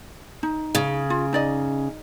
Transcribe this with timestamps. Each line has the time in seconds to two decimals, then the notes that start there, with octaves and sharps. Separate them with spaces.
0.43 D#4
0.75 C#3
1.10 F4
1.33 D#4 D5 D#5